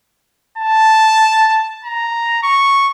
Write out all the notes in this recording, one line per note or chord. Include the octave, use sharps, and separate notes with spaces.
A5
A#5
C#6